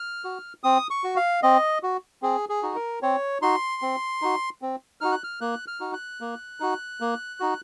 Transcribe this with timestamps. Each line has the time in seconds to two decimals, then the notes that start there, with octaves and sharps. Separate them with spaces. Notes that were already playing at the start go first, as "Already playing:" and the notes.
Already playing: F6
0.24 F#4
0.63 C4 D#6
0.90 C#6
1.04 F#4
1.16 F5
1.43 C4 D#5
1.83 F#4
2.22 C4 G#4
2.49 G#4
2.63 D#4 F#4
2.75 A#4
3.02 C4 C#5
3.42 D#4 F#4 C6
3.82 C4
4.22 D#4 F#4
4.62 C4
5.01 D#4 F#4 F6
5.12 F#6
5.24 F6
5.41 A#3 F#6
5.68 F6
5.80 D#4 F#4
5.94 F#6
6.21 A#3
6.60 D#4 F#4
7.00 A#3
7.40 D#4 F#4